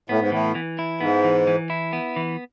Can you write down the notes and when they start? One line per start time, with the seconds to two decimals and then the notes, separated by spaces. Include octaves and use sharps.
0.09 A2 B3
0.20 G#2
0.31 A2 E3
0.55 E3
0.79 E4
1.01 G#2 B3
1.24 E3
1.47 E3
1.70 E4
1.93 B3
2.16 E3